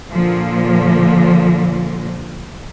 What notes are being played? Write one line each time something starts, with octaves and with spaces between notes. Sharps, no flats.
A#2 D3 F3